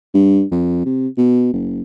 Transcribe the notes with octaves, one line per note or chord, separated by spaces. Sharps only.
G2
F2
C3
B2
F#1